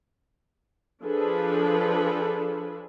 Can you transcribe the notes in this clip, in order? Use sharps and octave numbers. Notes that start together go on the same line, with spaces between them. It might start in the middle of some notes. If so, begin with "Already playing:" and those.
F3 D4 G#4 A4 B4